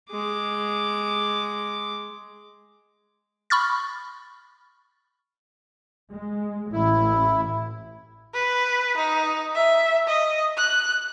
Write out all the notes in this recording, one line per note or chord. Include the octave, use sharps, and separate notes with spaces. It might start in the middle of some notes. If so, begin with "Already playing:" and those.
G#3 D6
B5 C#6 F6 A6
G#3
A1 E4
B4
D#4
E5
D#5
F#6